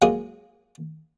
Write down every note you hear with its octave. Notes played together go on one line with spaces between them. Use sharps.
F#3 G#3 A#3 F4 G#4